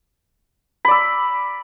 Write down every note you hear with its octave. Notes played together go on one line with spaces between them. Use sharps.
D5 B5 E6